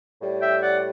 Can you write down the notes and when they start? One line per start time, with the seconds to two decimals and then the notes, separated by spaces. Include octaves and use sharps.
0.21 A2 G3
0.41 E5 G5
0.62 D5 F#5